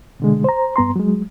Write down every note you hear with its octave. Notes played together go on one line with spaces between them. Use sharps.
B2 D3 G#3
C5 A#5
G2 B3 A#5 C6
F#3 G#3